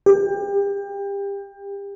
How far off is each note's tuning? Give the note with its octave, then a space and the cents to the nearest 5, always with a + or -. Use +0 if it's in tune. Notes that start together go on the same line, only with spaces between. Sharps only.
G4 +30